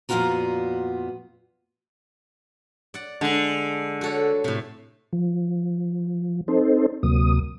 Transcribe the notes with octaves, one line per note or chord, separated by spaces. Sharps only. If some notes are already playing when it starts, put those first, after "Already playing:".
F2 A#2 B3 F4 F#4 A#5
D5 F#5
D3 G#3 A5
F#4 A4 C#5
A2 C3
F3
C4 D#4 A4 C5
D2 C3 F#3 A#3 D#6